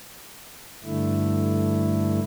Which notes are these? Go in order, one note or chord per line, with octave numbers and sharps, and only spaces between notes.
G2 D3 A3 E4